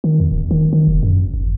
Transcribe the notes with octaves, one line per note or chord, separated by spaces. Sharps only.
D#3
E2
D1
D#3
D#3
F1
F#2
G1